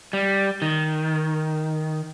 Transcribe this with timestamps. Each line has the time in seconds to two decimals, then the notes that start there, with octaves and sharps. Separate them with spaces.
0.13 G3
0.62 D#3